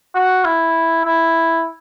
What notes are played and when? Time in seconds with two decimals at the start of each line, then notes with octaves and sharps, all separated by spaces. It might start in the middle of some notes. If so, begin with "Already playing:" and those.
0.15 F#4
0.45 E4
1.06 E4